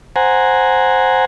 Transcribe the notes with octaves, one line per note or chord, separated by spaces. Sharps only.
C5 F#5 G#5 A#5